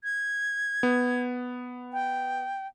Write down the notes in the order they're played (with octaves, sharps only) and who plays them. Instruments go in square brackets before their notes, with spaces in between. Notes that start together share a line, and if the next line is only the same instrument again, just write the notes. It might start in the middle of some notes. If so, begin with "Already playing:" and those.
[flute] G#6
[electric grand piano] B3
[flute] G5